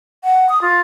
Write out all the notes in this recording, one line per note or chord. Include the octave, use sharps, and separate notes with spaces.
F#5
D#6
F4